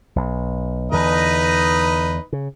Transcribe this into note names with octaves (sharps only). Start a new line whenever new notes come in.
B1
E2 D3 D#4 B4 D#5
C#3